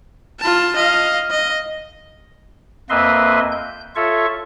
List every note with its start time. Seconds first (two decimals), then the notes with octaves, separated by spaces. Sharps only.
0.40 F4 A5
0.76 D#5 F5
1.30 D#5
2.90 F2 A#3 B4 D#5 E5 C6
3.52 G6
3.96 F4 A4 C#5 E5 C#6